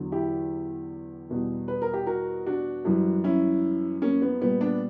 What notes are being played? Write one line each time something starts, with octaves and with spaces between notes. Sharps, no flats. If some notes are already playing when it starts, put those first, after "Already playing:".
Already playing: E2 D3 F#3
E4 G4
E2 B2 G3
B4
A#4
G4
F#4 A#4
D4 F#4
F#2 E3 G3
C#4 E4
A#3 C#4
B3
A#2 G3 B3
B3 D4